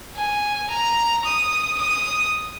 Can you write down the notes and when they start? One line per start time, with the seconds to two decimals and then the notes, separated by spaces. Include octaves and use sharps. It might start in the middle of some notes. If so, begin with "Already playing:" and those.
0.16 G#5
0.70 A#5
1.24 D#6
1.78 D#6